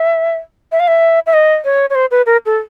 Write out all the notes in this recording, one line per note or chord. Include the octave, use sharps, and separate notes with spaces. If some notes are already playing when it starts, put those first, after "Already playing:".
Already playing: E5
E5
F5
E5
E5
D#5
C#5
C#5
C5
B4
A#4
A4